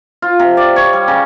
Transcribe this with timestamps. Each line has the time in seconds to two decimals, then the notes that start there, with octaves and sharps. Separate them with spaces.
0.22 F4
0.39 C3
0.57 D5
0.76 C#5
0.93 G3
1.08 C#3